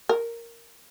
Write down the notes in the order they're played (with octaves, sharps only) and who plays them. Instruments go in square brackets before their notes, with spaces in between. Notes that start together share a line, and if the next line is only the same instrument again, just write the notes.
[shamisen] A#4